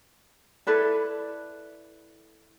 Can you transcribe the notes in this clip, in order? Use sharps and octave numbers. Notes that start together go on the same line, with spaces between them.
E4 A4 B4 D5